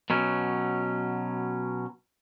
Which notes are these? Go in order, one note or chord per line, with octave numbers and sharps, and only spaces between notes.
B2 F#3 C#4